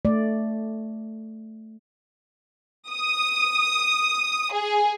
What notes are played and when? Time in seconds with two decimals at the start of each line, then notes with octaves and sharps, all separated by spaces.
0.05 A3 D5
2.89 D#6
4.52 G#4